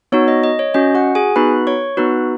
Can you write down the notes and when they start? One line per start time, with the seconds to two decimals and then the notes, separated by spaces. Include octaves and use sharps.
0.12 B3 D#4 F#4 C#5
0.28 D#5
0.44 D#5
0.59 C#5
0.74 C#4 F#4 D#5
0.95 F#4 F#5
1.15 G#4 G#5
1.36 B3 D#4 F#4 B4 B5
1.67 C#5 C#6
1.97 B3 D#4 F#4 B4 B5